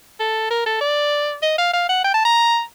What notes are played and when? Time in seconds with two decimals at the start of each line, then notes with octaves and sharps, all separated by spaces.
0.20 A4
0.50 A#4
0.66 A4
0.81 D5
1.43 D#5
1.58 F5
1.74 F5
1.89 F#5
2.04 G5
2.14 A5
2.25 A#5